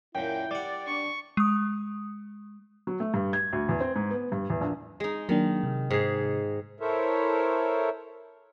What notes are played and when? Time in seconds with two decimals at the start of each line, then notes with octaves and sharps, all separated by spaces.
0.15 F#2 A#2 E4 G5
0.51 G3 D5 F#5
0.87 D4 C#6
1.37 G#3 D#6
2.87 F#3
3.00 A3
3.14 G2
3.33 G#6
3.53 D2
3.69 E2
3.80 C4
3.96 G#2
4.10 B3
4.32 G2
4.50 E2
4.61 A#1
5.00 G#3 D#4
5.29 D#3 F#3 A#3 D4
5.63 C3
5.90 G#2 G#4
6.80 E4 A4 A#4 C5 C#5 E5